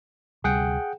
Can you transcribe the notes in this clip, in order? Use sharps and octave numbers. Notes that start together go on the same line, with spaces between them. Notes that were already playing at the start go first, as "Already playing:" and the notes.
D2 C3 G3 G#4 F#5 G5